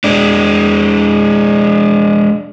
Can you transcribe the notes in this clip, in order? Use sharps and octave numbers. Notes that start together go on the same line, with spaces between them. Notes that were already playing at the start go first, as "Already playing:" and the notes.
G#3 D4